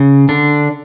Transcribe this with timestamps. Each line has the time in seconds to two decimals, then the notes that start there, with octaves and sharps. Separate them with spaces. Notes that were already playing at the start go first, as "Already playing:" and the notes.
Already playing: C#3
0.29 D3 D4